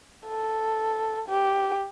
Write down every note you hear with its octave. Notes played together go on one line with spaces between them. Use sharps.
A4
G4